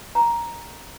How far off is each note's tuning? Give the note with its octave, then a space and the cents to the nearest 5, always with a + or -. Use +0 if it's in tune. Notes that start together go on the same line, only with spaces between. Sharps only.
A#5 +5